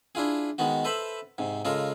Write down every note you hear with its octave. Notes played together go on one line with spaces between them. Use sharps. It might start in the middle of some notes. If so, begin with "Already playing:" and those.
D4 E4 F4 G#4
D#3 G#3 B3 F#4
A4 B4 C5 E5 B5
G#2 C3
C#3 G#3 F4 A4 A#4